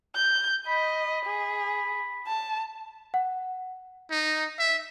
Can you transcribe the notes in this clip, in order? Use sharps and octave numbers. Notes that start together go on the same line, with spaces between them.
G6
D#5 B5
G#4
A5
F#5
D#4
E5